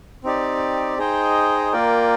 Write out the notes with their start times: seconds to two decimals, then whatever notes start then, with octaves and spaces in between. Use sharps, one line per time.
0.24 C4 D#4 G4 D5
0.98 D#4 G#4 C5 D#5 G5
1.72 A#3 F4 A#4 D5 G5